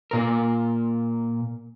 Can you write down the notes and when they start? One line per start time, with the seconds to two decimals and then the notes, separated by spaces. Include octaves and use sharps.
0.11 A#2 A#4